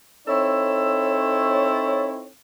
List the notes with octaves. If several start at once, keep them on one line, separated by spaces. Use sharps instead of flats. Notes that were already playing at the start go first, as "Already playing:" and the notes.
C4 D#4 E4 A4 C#5